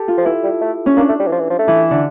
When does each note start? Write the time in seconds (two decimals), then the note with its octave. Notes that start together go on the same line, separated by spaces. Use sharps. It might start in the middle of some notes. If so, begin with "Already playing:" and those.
Already playing: G4 A4
0.08 F4
0.18 F3
0.25 E3 E4
0.44 G3
0.61 A3
0.86 C#4
0.97 A#3 D4
1.09 A3
1.20 G3
1.27 E3
1.32 F3
1.40 E3
1.50 F3
1.59 A3
1.68 E3
1.91 D3